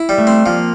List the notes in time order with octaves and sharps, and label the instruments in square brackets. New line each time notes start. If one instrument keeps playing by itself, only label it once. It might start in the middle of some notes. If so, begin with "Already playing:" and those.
Already playing: [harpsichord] E4
G3
[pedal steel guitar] A3
[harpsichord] C4
[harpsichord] F3 [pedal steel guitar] A#3